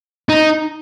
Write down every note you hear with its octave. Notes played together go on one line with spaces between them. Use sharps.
D#4